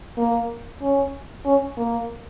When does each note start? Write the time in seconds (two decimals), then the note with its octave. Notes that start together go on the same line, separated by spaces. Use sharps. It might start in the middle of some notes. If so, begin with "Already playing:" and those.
0.18 A#3
0.81 C#4
1.46 C#4
1.77 A#3